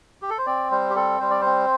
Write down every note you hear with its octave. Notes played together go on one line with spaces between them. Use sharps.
G4
A4
C5
C4 D5
G3 C5
G4
C4 A4
G3 C5
D5
C5
C4